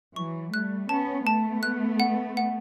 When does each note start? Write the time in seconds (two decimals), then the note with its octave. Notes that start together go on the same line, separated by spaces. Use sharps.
0.16 E3 F#3 C#6
0.53 G3 A3 F#6
0.89 B3 C#4 A5
1.26 A3 B3 A5
1.63 F#6
2.00 F#5
2.37 F#5